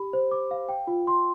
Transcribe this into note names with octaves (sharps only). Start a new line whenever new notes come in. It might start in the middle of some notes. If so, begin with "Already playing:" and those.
Already playing: G4 B5
C5
D6
F5
G5
F4
C6